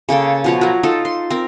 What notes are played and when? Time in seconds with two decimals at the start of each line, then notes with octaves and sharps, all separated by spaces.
0.09 C#3 A#3 A4 G5
0.44 B2 F3 C#5
0.61 F#3 A#4
0.83 D#4 F4 A4
1.05 C6
1.30 C4 A#4